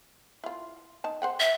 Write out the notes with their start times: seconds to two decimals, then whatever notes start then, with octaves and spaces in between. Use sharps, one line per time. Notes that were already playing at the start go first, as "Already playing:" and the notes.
0.44 E4 F4
1.04 D#4 A5
1.22 C5 F#5 G5
1.40 E5